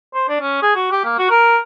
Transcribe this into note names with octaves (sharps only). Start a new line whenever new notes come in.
C5
D4
C#4
G#4
F#4
G4
A#3
F#4
A#4